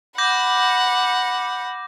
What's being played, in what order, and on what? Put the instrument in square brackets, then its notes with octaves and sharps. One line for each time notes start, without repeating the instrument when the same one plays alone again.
[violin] F#5 B5 [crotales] D6 G6 A#6